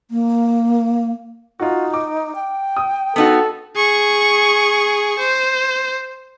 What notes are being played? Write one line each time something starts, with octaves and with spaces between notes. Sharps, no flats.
A#3
D#4 F4 F#4
D6
G5
D#6
B3 D#4 F#4 A4
G#4 C#6
C5